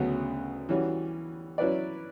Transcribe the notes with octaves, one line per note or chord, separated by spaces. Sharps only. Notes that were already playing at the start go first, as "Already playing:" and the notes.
Already playing: D2 C#3 F#3 B3 F#4
E3 G3 C#4 F#4
F#3 C#4 E4 B4 D5